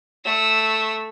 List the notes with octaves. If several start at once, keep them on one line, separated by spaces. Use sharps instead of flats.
A3 E6